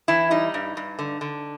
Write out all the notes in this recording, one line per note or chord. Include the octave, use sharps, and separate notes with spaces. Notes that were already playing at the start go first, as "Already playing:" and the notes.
E3 E4
G3 D#4
G2
G2
D3
D3